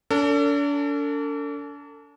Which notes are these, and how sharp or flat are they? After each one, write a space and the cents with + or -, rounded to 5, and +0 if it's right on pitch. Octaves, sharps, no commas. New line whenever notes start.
D4 -40 A4 +40